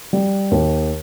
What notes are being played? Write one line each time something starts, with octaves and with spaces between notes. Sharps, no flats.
G3
D#2